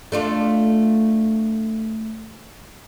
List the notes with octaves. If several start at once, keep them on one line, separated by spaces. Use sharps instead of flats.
A3 D4 F4